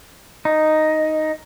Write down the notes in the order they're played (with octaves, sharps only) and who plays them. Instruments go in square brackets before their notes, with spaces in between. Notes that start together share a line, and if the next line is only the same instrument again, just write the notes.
[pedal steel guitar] D#4